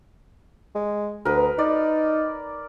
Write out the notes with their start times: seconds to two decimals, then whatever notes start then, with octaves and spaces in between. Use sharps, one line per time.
0.75 G#3
1.25 D2 A#4 B4
1.59 D#4 D5